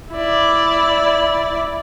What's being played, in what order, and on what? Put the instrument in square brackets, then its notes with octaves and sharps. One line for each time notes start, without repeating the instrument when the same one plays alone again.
[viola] E4 D5